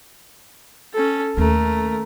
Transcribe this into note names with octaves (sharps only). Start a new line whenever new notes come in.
C#4 A4
D#2 A3 C#4 A#4